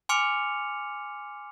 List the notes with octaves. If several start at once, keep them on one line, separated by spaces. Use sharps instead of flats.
G#5 C6 D6 F6 C#7 F7